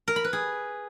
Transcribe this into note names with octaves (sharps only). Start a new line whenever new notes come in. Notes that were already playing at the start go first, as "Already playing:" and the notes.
A#4
B5
B4
G#4